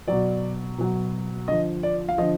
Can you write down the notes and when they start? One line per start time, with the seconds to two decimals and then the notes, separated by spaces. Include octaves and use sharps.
0.08 B2 F#3 D5
0.78 B2 F#3
1.48 D3 F3 D#5
1.83 D5
2.09 F5
2.18 D3 F3 D#5